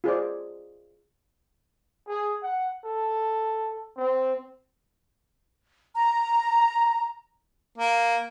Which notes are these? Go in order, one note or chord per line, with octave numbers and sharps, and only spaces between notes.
F4 G#4 C5 D5
G#4
F#5
A4
C4
A#5
A#3